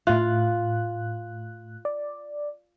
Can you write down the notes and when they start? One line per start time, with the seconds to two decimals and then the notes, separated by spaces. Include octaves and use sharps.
0.07 A2 F4 F#6
1.85 D5